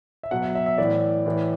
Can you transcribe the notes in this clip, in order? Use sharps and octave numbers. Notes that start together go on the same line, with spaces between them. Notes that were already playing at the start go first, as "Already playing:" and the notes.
E5
B2 F#3 F#5
E5
E5
E5
A2 E3 D5
A2 E3